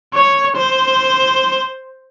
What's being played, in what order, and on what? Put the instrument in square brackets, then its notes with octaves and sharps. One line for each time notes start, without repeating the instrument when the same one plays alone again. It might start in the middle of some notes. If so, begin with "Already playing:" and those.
[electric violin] C#5
C5